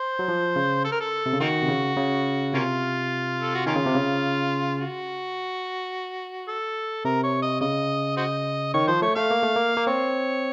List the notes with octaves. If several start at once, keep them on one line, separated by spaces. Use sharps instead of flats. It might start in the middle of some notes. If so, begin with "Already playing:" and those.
Already playing: C5
F#3
F3
C#3
A4
A#4
A4
C3
C#3
D#3 A#3 D#4 F#4
C3
C#3
C#3
C3 A#3 C#4 F4
A4
F#4
D#3 A#3 C#4 F4
C#3
C3
C#3
F#4
A4
C3 A#4
C#5
D#5
C#3 D#5
F#4 C5 D#5
D#3 C#5
F3 C5
A3 C#5
A3 F5
A#3
A3
A#3
A#3
C4 C#5